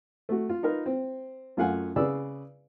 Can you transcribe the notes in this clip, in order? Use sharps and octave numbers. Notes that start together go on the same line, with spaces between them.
A3 F#4
F4
D#4 F4 A#4 B4
C4
F#2 A3 F4 F5 F#5 G#5
C#3 G#4 B4 D5 E6